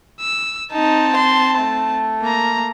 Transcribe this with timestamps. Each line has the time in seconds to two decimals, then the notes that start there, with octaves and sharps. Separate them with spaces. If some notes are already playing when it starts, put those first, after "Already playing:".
0.21 E6
0.72 C4 D#4 A5
1.16 C6
1.59 A3
2.22 A#3 A#5